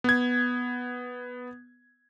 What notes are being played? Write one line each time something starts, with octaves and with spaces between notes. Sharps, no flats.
B3 G#6